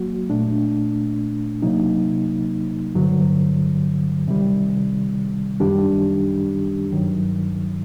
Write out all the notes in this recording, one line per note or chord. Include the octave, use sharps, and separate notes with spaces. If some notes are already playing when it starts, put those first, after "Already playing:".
Already playing: F#3 A#3 F#4
A#2 A3 D4
C3 F#3 A#3 D#4
G2 D3 F#3
C3 D#3 G3
F#2 D#3 G3 D4 G4
G2 D#3 F#3